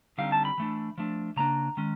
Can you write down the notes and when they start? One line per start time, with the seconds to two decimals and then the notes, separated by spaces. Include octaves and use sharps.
0.18 D3 G3 C4 D#4 F5
0.32 A5
0.45 B5
0.58 E3 A3 D4
0.98 F3 A3 D4
1.36 C#3 F3 A#3 D4 A#5
1.77 D#3 G#3 C#4